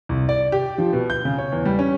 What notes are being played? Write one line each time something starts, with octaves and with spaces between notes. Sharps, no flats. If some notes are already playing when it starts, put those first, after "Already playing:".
C2
D5
G4
F3
B2
G6
C#3
C#5
E2
G3
C#4